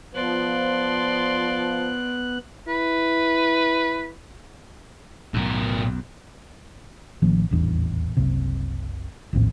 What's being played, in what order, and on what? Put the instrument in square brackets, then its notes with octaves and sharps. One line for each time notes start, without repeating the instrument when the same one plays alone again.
[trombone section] F3 [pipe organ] B3 F#6 [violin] D5 C6
[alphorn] E4 [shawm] B4
[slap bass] B1 F#2 [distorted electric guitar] A2 A#4
[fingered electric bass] A1 D#3 F3 A#3
D#1 A1 E2 D4
F#1 C2 C3
A#1 D#2 A2 C4